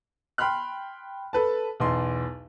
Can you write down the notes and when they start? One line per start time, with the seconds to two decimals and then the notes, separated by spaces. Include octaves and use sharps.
0.38 G5 B5 C6 F6 F#6
1.33 A4 B4 A5
1.80 B1 E2 C6